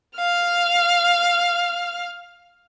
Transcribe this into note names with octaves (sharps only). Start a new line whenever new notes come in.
F5 F6